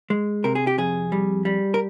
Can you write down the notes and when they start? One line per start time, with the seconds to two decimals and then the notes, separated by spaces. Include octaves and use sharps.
0.10 G#3
0.44 C3 A#4
0.55 G#4
0.67 G4
0.78 F2 G#4
1.12 G3
1.45 G3
1.74 A#4